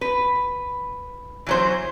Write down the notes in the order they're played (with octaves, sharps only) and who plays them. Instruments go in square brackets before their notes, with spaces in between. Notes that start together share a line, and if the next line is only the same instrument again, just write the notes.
[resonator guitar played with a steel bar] B4
E3 F#3 C5